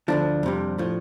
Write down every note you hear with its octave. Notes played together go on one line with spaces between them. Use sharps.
D2 D3 F3 D4
F2 C3 G3
A2 F3